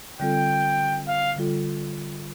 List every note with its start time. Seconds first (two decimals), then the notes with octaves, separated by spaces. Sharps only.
0.20 D3 G3 C4 F4 A4 G5
1.07 F5
1.36 D3 G3 F4 A4